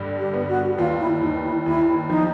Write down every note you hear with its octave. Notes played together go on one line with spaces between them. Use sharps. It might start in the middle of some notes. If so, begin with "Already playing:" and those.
Already playing: G2 D3 G3
G4
B3
F#4
D#2 F4
E4
D#2 D#4
E4
D#2 E4
F3 D#4